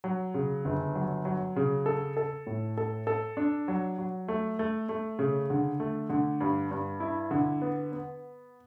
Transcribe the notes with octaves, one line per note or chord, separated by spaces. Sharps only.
F#3
C#3
G1
F#3
F#3
C#3
A4
A4
A2
A4
A4
D4
F#3
F#3
A3
A3
A3
C#3
D3
A3
D3
G2
G2
E4
D3
B3
B3